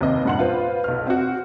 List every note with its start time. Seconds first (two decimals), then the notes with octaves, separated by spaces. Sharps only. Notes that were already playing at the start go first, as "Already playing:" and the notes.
0.01 D#2 C3 B4 D#5
0.25 G2 A#2 F#5 C6 F#7
0.39 F4 B4 C5
0.84 B1 F6
1.07 C4 F#4